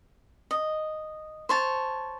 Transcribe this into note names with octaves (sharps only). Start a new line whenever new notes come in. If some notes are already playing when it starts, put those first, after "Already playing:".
D#5
C5 C#5 A5